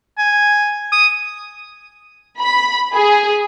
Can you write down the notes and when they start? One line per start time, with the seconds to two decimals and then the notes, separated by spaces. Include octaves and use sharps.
0.18 G#5
0.92 D#6
2.41 B5
2.94 G#4